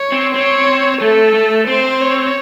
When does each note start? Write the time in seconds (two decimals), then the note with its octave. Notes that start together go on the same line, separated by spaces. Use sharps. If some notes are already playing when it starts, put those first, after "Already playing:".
Already playing: C#5
0.12 C4
0.34 C4 C#5
1.01 A3 A4
1.34 A3
1.67 C4 C5
2.01 C#5